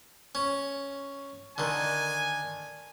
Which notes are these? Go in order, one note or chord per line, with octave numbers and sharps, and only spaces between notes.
C#4
D3 D#3 G#5